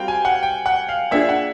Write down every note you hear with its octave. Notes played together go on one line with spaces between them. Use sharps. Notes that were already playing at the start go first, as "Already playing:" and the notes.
Already playing: G3 C4 F#4 A4 F5 G5
G#5
F#5
G5
F#5
F5
A#3 D4 F4 G#4 E5
F#5